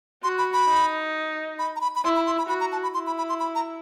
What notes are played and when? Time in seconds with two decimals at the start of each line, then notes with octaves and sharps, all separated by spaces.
0.23 F#4 C6
0.38 B5
0.53 B5
0.69 D#4
1.59 B5
1.76 A#5
1.81 B5
1.95 B5
2.04 E4 C6
2.16 B5
2.26 C6
2.38 B5
2.49 F#4 B5
2.60 A#5
2.72 A5
2.83 B5
2.94 E4 C6
3.07 B5
3.18 B5
3.29 C6
3.39 B5
3.55 A#5